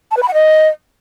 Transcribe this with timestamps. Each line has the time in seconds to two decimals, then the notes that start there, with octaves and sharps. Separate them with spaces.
0.11 A5
0.17 B4
0.22 B5
0.28 F#5
0.34 D#5